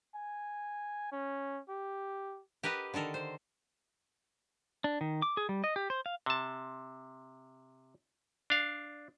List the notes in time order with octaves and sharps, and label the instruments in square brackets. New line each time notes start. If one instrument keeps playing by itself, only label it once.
[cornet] G#5
C#4
G4
[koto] G4 A#4 B4 D#5 F#5
D3 D#3 A4 A#4
C5
[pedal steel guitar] D4
D#3
D6
G#4
G3
D#5
G4
C5
F5
[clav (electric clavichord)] C3 A5
D4 F5